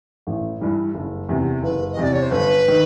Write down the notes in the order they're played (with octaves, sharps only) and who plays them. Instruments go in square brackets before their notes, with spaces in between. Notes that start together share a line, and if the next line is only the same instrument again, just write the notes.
[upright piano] A1
G2 E3 G3
F#1
E2 C3
[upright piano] F#1 [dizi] B4
[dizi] D#5
[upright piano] E2 C3 [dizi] D5
[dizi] C#5
C5
[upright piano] G1 [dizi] B4
[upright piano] D#3